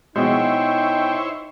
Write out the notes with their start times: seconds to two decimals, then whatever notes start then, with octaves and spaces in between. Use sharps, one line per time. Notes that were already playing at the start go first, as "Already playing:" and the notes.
0.16 B2 G#3 D#4 E4 C5 C#5 G5